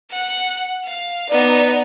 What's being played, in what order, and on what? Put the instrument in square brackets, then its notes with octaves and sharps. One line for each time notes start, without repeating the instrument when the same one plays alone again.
[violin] F#5
F5
[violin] B3 D#4 [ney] D5